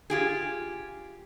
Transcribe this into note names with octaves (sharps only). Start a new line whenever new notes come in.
F4 G4 G#4